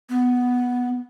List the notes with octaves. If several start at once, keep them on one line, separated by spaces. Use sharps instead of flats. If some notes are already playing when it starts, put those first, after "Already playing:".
B3